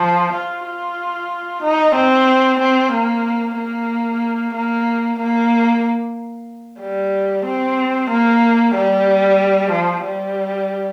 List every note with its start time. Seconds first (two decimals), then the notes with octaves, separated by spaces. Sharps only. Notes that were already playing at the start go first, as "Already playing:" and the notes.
Already playing: F3
0.33 F4
0.65 F4
1.63 D#4
1.95 C4
2.60 C4
2.93 A#3
3.57 A#3
4.54 A#3
5.19 A#3
6.80 G3
7.45 C4
8.10 A#3
8.75 G3
9.71 F3
10.04 G3